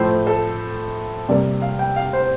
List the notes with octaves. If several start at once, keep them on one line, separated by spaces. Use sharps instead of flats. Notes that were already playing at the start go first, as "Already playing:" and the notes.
Already playing: A2 F3 A3 C5
A4
C3 G3 A#3 D5
F5
G5
F5
C5